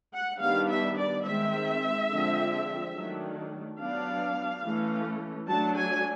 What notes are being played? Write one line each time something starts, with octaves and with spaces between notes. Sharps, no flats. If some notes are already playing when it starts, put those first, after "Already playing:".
F#5
D#3 G3 B3 D4 F5
E5
D5
D#3 G#3 C4 E5
D3 F3 G#3 C4
D#3 F#3 A3 D4
F#3 B3 D4 F5
E3 A3 C#4
F#3 A3 D4 A5
G#5